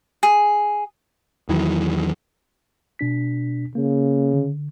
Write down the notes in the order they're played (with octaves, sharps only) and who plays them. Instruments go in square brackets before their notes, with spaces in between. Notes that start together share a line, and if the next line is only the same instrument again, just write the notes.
[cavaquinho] G#4
[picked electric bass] E2 D#3 E3 F#3
[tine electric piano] B2 D4 B6
[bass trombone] C#3 [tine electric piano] A#3
[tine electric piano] D3